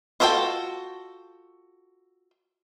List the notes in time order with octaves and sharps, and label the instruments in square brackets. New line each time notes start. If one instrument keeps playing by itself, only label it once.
[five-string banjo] F4 F#4 A4 D5 G5